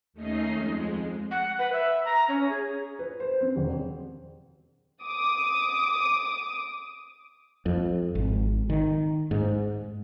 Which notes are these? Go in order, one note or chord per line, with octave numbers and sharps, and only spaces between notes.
D#2 A3 C#4 D#4 D#5 C7
F2 G#3
F#5
B4
E5
A#5
C#4
G#4
B4
C5
C4
E1
D6 D#6
F2
G#1
D#3
G#2